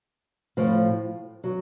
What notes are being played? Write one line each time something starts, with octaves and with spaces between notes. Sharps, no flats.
A2 F3
F#3